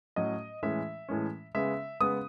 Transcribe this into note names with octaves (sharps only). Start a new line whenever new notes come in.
A2 F#3 C#4 D#5
A2 E3 G#3 C#4 E5
A2 E3 G#3 C#4
C#3 G#3 B3 E5
C#3 G#3 B3 D#6